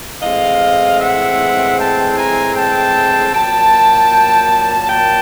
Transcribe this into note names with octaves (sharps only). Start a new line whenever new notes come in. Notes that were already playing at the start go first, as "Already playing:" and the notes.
A2 E3 G#3 C4 D#5 F5
E5 F#5
G5 A5
G#5 A#5
G5 A5
A#2 F#3 A#3 G5 A5
G5 A5